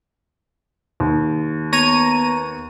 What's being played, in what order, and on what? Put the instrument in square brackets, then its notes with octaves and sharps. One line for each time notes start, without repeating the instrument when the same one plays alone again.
[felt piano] D#2
[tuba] B3 [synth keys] C#5 A#5 D#7